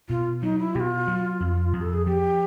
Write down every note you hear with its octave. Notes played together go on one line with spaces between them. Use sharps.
B2 F4
F#3 D#4
E4
B2 F4 G4
F#3
F2
F2
A4
G#4
F3 G4